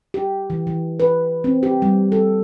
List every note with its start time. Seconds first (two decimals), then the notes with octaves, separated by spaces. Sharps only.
0.14 G4
0.50 E3
0.67 E3
1.00 B4
1.44 C4
1.63 G4
1.82 G3
2.12 A4